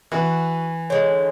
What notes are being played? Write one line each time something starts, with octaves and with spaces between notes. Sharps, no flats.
E3 F#4
D3 G#3 C#5